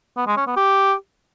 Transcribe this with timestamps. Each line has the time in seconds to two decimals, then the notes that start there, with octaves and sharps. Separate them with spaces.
0.17 B3
0.27 G#3
0.37 C#4
0.47 B3
0.57 G4